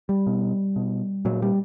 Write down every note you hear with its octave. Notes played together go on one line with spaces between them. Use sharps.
G3
B2
B2
A#2 F#3
G3